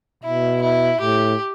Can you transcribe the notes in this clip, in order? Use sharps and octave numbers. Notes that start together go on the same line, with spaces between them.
B2 E4
E4
A2 G4